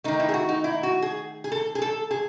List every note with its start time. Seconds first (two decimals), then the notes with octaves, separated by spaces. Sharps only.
0.04 D#3 A3 D#4
0.19 E4
0.29 G#4
0.34 F#4
0.49 D#4
0.64 E4
0.83 F#4
1.02 G#4
1.44 G#4
1.52 A4
1.75 G#4
1.82 A4
2.11 G#4